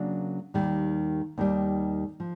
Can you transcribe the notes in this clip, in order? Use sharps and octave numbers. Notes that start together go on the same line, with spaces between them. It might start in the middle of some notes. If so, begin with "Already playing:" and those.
Already playing: C#3 F#3 A#3 D4
D#2 D#3 G3
D#2 D#3 G3
F3